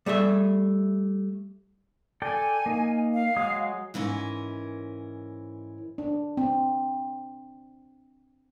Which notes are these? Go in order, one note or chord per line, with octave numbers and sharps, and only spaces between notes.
G3 A3 G#4 E5
A4 D5 G5 G#5
A#3 D#4
F5
F#3 G#3 D#6
G#2 E3 C#4 A#4
D4
C4